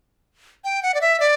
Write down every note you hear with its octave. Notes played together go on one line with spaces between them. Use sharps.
G5
F#5
D5
E5
D5